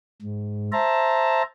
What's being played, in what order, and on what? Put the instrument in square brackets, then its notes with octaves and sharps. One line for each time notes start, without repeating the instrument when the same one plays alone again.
[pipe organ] G#2
C5 E5 A5 A#5